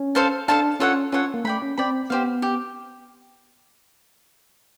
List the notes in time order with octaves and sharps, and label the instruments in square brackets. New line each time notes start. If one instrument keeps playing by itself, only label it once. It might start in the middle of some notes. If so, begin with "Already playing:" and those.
Already playing: [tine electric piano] C#4
[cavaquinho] A4 C5 F5 A5
[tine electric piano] D4 [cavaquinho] A4 C5 F5 A5
[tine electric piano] C#4 [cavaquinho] F4 A4 C#5 F#5
[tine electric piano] C#4 [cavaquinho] F4 A4 C#5 F#5
[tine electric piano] A#3
[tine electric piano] A3 [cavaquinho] D5 G5 B5
[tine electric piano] C#4
[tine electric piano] C4 [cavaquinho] D5 G5 B5
[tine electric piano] B3 [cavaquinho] G4 C5 F5
[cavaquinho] G4